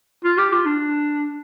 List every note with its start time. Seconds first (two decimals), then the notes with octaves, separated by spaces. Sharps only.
0.25 F4
0.38 G4
0.52 F4
0.66 D4